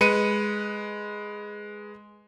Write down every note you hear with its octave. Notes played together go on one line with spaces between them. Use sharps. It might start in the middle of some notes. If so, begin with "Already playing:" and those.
G#3 B4 C#7 D#7